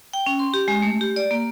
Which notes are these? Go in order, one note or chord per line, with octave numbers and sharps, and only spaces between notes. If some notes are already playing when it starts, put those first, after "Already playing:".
G5
C#4
C6
G4
G#3
A3
G4
D5
A#3